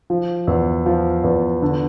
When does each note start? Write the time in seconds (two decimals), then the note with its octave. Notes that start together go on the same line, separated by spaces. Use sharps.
0.10 F3
0.47 E2
0.86 F3
1.24 E2
1.62 D3